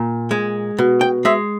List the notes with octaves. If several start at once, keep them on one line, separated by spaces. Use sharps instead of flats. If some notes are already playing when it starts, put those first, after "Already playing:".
Already playing: A#2
G#3
B2
G5
G#3 E5